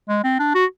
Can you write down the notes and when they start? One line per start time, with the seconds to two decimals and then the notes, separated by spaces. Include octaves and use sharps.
0.09 G#3
0.24 C4
0.40 D4
0.55 F#4